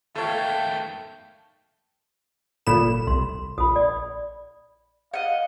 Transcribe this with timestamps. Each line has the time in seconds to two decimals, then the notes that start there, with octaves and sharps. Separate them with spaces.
0.16 D#3 A3 A4 C#5 F5 G5
2.67 G1 A#2 A4 B5 E7
3.07 C2 C6
3.58 A#1 B5 D#6
3.76 D5
5.14 D#5 F5 F#5